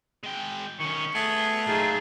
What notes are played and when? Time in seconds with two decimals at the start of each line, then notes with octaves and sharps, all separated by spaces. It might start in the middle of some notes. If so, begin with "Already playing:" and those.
0.23 G#3 G5
0.80 D#3 C#4 C#6
1.15 A3 B3 G#4
1.67 A#2 F#3 D#4 F4 G#4